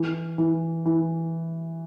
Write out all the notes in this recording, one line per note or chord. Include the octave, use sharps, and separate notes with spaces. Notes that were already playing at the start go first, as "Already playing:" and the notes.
Already playing: E3
E3
E3